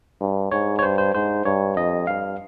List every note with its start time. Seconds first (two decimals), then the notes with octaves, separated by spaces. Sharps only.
0.20 G2
0.51 G#2 C#5
0.79 C#5
0.83 G2 C5
0.98 C5
1.14 G#2 C5
1.45 G2 C#5
1.76 F2 D#5
2.07 G2 F5